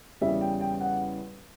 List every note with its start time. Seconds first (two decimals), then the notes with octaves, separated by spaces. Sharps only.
0.21 E2 C#3 G3 E5
0.41 G5
0.61 G5
0.81 F#5